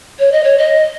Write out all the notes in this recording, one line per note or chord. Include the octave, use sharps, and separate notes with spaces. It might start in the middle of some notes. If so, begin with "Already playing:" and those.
C#5
D#5
C#5
D#5